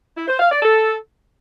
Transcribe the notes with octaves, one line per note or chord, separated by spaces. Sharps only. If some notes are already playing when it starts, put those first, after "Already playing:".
E4
C5
F5
D5
A4